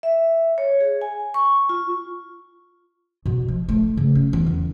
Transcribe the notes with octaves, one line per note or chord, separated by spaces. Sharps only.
E5
C#5
G#4
G#5
C#6
F4
B2
F3
A3
C#3
C#4
E2
D#3